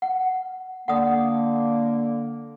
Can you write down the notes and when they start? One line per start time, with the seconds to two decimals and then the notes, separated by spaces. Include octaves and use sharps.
0.02 F#5
0.88 D3 A#3 F#5 D#6